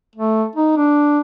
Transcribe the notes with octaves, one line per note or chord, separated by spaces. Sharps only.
A3
D#4
D4